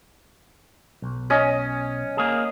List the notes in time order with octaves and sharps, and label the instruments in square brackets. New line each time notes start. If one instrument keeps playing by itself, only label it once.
[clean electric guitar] B1
[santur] C#4 D#5
[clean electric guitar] A#3 G#4